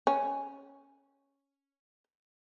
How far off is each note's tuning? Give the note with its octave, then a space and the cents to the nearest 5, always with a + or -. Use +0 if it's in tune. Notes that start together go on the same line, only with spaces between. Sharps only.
C#4 +0